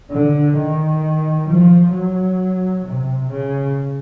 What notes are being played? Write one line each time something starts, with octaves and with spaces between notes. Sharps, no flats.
D3
D#3
F3
F#3
C3
C#3